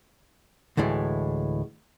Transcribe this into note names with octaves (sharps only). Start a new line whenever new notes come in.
D2 A2 E3 G#3